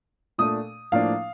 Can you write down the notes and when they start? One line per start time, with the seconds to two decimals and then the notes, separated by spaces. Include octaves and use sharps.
0.38 A#2 A3 D4 D#6
0.92 A2 F3 A#3 D4 F5